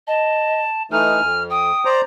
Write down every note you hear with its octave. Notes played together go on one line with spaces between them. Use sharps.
D#5 A5
E3 A3 D#4 G#5 F6
F2
G5 D#6
C5 D5 A#5